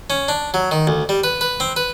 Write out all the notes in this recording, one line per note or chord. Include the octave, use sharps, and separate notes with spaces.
C#4
D4
F#3
D#3
D2
G3
B4
B4
C4
B4